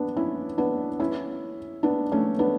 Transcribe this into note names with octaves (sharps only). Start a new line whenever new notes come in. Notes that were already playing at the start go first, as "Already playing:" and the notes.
Already playing: B3 D4
C#4 E4
B3 D4
C#4 E4
B3 D4
A3 C#4
B3 D4